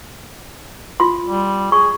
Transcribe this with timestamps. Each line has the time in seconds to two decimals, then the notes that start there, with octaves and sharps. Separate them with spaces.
1.00 F4 C6
1.25 G3
1.72 G#4 C#6